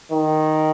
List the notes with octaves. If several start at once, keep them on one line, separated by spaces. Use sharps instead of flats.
D#3